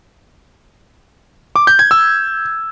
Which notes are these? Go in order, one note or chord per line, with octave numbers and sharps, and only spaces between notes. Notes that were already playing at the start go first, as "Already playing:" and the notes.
D6
G6
G#6
E6